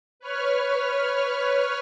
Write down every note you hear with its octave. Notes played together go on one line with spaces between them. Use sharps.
B4 C#5 F6